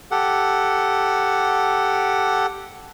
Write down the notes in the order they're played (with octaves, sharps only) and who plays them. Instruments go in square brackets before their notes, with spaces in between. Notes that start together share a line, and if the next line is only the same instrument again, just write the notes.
[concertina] G4 A4 F#5